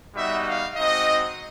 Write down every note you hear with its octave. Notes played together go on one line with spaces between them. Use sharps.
G3 B3 D#4 F#4 E5
F5
G#3 C4 D#4 F#4 D#5